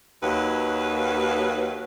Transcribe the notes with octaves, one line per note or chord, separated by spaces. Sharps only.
D#2 F#3 B4